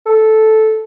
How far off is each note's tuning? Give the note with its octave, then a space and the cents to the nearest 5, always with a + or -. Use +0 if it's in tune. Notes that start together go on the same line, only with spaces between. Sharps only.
A4 -10